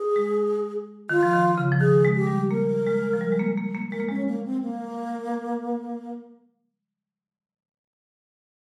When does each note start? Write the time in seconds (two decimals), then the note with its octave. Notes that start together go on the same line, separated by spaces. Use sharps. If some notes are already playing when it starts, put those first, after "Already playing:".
Already playing: G#4
0.16 G#3
1.09 D#3 F4
1.23 F3
1.33 D#3
1.58 C#3
1.72 F3
1.81 D#3 G#4
2.05 G#3
2.16 G4
2.27 G3
2.51 A#3 A#4
2.87 G#3
3.13 F3
3.21 G3
3.32 G#3
3.39 A#3
3.57 A#3
3.75 A#3
3.91 G#3 A#4
4.00 A#3
4.09 G#3 C#4
4.28 A#3
4.45 C4
4.62 A#3